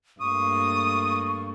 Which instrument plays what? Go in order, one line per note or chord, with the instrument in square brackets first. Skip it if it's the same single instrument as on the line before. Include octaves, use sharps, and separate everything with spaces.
[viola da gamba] G2 A3 A#3 [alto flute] C#6 [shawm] D#6